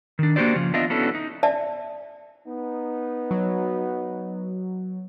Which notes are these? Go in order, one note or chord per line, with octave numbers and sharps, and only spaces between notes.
D#3 D4
A#3 D4 F#4 G4 C5 D5
C#3 F3
B3 D4 F4 D#5 E5
B3 C#4 D4 E4 F#4 A4
D#4
D5 E5 A5
B3 D#4
F#3